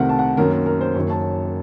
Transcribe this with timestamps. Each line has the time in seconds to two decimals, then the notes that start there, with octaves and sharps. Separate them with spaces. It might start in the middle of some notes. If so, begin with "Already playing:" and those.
Already playing: C2 C3 D#3 A3 C4 A#4 F#5
0.09 A5
0.19 F#5
0.37 F#2 D#3 A#3 C#4 A#4
0.52 A#4
0.66 A#4
0.81 C5
0.95 F#1 F#2 D#3 C#5
1.10 A5